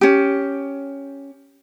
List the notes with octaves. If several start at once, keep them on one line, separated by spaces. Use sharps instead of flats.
C#4 G4